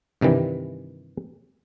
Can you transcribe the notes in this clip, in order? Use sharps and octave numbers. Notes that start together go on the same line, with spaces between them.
G2 C3 D#3 E3 G3